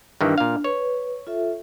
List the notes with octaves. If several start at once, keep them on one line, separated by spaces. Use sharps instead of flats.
G2 D#3 E3 D4
A#2 F5
B4 C#5
F4 A4 E5